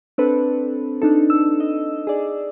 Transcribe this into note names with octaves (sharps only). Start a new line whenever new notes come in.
C4 D4 A4 B4
D4 D#4 A4
E6
D#5
G#4 D5